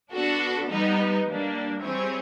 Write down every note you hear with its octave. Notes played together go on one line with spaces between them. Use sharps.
B3 D4 F#4 A4
G3 B3 D#4
G3 A#3 D4
G3 C4 E4 G#4 C#5